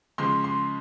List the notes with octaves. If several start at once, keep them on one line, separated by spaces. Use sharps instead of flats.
C#3 F3 G#3 C6
C6